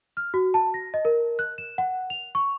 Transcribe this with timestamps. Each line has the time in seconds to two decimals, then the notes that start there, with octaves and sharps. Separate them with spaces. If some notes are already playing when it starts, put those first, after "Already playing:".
0.17 F6
0.34 F#4
0.54 A5
0.74 A#6
0.94 D#5
1.05 A#4
1.39 F#6
1.58 E7
1.78 F#5
2.10 F7
2.35 C#6